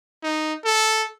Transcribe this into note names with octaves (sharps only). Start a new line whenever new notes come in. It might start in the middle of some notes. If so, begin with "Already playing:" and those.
D#4
A4